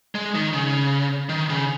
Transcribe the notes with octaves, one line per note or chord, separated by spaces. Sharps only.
G#3
D#3
C#3
D#3
C#3